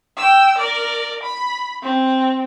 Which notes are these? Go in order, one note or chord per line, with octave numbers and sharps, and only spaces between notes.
G5 E6
A#4 D5
B5
C4